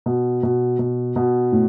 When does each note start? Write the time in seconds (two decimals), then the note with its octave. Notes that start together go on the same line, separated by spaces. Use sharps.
0.06 B2
0.43 B2
0.79 B2
1.16 B2
1.52 A2